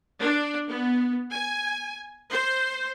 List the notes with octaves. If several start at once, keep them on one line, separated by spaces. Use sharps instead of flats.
D4
B3
G#5
C5